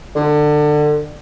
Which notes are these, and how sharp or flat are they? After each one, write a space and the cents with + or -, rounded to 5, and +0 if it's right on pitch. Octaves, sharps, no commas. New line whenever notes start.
D3 +25